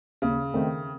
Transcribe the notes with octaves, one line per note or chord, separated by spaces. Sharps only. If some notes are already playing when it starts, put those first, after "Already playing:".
D#2 C#3
D#3 A3 C4